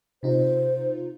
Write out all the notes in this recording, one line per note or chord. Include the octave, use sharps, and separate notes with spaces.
C3 D#4 F4 C5